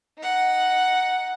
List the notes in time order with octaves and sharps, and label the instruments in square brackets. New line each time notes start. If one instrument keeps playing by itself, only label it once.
[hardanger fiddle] D#4 F#5